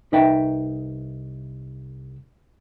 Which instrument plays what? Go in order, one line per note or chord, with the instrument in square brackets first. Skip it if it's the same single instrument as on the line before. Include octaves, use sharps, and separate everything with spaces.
[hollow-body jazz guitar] C2 D#4 B4 E5 G5